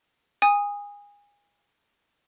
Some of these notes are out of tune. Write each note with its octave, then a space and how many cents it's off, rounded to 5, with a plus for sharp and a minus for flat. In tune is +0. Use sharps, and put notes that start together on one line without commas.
G#5 -25 D#6 +0